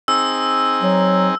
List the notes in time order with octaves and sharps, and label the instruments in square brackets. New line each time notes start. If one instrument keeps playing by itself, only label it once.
[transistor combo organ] C4 D#4 G#4 [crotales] E6
[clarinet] F#3